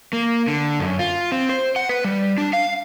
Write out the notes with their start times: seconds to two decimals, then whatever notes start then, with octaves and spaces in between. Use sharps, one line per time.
0.13 A#3
0.48 D3
0.80 F#2
0.99 F4
1.32 C4
1.49 C5
1.76 F#5
1.89 B4
2.04 G3
2.38 D4
2.53 F5